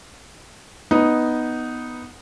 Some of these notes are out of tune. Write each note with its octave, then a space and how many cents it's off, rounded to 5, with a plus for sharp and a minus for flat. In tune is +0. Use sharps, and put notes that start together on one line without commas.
B3 +0 D#4 +0